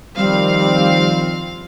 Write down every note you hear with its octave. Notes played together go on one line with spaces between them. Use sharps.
D#3 F3 G3 C4 F5